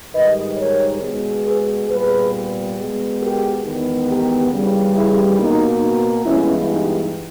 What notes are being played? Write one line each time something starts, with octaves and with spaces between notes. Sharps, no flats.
G#2 D#3 G3 B4 D#5
A#4 C#5
B2 G#3 B3
G#4 B4
A#2 G3 B3 G#4 B4
B2 G#3 B3
G4 A#4
E2 D#3 G#3 B3
G4 A#4
D#2 C#3 E3 G3
E4 G#4
B2 A#3 D#4
G2 E3 G#3 B3 C#4 E4
D#4 G4